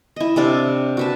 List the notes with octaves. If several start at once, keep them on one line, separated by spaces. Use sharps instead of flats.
E4 D#5
C3 D4 D5 F5
F#4 B4 A5